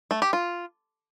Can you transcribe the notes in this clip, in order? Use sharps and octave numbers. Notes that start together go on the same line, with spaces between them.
A3
G4
F4